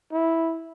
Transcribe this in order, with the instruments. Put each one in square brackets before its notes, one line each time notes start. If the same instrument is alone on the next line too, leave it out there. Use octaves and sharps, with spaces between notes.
[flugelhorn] E4